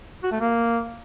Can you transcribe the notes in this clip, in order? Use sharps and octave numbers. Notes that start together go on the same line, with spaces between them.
F#4
A3
A#3